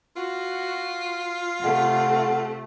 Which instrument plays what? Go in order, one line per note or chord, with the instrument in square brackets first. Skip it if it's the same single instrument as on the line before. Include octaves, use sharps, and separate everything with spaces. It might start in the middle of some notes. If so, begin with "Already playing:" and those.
[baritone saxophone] F4 [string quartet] F#4
[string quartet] C3 A3 [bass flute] F#5